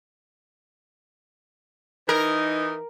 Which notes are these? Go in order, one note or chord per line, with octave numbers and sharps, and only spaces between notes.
E3 D#4 A#4